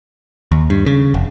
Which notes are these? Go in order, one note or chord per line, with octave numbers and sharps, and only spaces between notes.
D#2
G2
C#3
F1